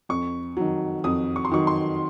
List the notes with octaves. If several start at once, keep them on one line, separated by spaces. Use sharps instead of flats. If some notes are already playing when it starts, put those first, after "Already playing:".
F2 C#6
D#3 F#3
F2 D#6
C#6
C6
D#3 F#3 C#6
C6